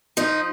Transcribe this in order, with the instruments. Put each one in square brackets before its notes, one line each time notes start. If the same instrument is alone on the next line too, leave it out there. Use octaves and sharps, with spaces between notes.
[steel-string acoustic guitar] F3 D#4